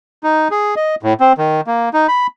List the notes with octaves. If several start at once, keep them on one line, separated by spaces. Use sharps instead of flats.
D#4
G#4
D#5
A2
C4
D#3
A#3
D#4
B5